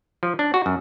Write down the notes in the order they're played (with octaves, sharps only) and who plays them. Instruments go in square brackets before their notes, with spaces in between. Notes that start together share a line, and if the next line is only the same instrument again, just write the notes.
[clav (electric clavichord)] F3
D4
F#4
F#2